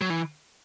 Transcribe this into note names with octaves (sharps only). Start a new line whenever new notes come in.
F#3
E3